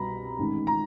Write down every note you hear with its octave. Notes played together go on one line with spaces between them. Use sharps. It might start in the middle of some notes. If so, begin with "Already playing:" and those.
Already playing: C2 B2 A#5 B5
A1 G#2 D#3
A#5